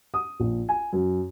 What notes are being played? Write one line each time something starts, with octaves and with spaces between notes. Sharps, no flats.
D#6
A#1
G#5
F#2